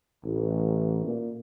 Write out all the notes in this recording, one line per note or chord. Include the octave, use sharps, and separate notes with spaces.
A1
A#2